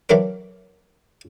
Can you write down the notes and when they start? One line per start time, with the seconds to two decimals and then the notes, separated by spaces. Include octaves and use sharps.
0.09 E3 F#3 D4 A#4